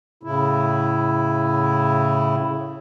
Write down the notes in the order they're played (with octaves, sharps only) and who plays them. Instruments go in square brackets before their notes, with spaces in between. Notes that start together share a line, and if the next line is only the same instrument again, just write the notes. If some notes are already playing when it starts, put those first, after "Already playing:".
[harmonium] A2 C#3 E4